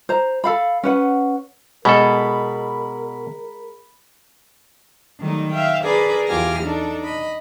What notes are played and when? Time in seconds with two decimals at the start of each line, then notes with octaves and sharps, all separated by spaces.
0.09 C5 A#5
0.44 A4 F5 B5
0.83 C#4 B4 F#5
1.85 B2 G#3 A4 A#4 B5
5.21 D#3 F#3 G3 A3 D#4
5.52 E5 F5 G5
5.83 D4 G#4 A#4 B4 D5 B5
6.28 E2 F4 G4 G#5 F6 A#6
6.63 D4 D#4 A4
7.05 D#5 B5